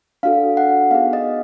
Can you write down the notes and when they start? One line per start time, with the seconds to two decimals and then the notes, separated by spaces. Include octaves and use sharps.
0.23 D4 F#4 A4 F5
0.57 F#5
0.91 B3 D#4 G#4 F5
1.13 D#5